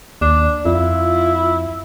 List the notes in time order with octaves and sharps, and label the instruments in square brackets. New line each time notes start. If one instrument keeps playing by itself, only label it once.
[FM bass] D#2 [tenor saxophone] D4
[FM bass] F2 [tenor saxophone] E4 [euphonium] F4